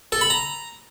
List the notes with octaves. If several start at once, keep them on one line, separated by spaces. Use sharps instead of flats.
A4
B5
A#5